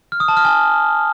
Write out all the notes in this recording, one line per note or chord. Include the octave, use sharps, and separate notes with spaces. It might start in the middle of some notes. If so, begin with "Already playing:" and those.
F6
D#6
A5
F6
G#5